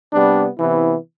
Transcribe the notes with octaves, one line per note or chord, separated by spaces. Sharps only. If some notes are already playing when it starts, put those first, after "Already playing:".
C3 G3 B3 D4
C3 E3 B3 E4